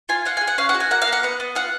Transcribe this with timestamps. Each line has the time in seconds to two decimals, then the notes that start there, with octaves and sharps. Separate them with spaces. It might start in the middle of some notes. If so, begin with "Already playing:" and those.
0.09 F4 G#5
0.25 F4 F#5
0.37 G#5
0.41 G#4
0.47 F#5
0.58 C#4 F5
0.69 F#5
0.75 F#4
0.80 G#5
0.91 A#3 F#5
1.02 F5
1.07 A#3
1.12 F#5
1.23 B3 F#5
1.40 B3
1.55 F4 F#5